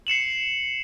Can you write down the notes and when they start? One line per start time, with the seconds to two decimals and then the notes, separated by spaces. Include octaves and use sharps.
0.07 C7 C#7 E7 F#7